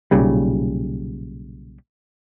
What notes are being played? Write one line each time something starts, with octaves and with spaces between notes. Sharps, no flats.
B1 A#2 C#3 G3